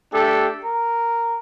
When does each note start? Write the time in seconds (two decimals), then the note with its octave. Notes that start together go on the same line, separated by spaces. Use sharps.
0.13 A3 D4 G4 A4
0.63 A#4